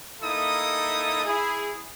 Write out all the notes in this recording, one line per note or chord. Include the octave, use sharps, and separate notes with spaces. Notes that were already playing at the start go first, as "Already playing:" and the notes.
A#3 D#4 E4 A4 D#6
E4 G#4